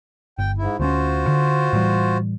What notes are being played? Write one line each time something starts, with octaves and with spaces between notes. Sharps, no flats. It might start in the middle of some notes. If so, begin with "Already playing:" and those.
G1 G5
G#2 E4
D2 A3 C#4 F4 F#4 C5
D3
A2 E3 G3